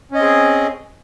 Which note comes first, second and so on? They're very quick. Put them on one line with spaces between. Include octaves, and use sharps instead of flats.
C#4 D#5 C4 G#4